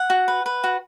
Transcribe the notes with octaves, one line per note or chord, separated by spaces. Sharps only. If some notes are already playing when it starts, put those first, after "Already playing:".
Already playing: F#5
F#4
B4
B4
F#4